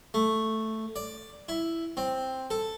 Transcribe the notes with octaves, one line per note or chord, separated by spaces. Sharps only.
A3
D5
E4
C4
A4